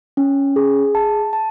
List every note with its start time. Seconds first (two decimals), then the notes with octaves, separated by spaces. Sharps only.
0.17 C#4
0.56 G#4
0.95 A5
1.33 A5